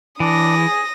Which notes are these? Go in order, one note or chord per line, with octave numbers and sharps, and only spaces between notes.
E3 D4 D#6 A#6
G#4